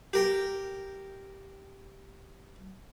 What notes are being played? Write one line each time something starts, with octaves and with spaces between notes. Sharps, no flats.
G4 A#4 G5